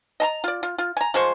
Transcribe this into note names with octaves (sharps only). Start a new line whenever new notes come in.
D#5 A5 A#5
F4 D5
F4
F4
G#5 A#5
F3 G#3 C5 C#6